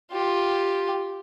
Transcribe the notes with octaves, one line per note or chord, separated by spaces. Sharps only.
F4 G4